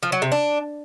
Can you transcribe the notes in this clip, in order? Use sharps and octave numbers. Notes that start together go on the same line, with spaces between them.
F3
F#3
C3
D4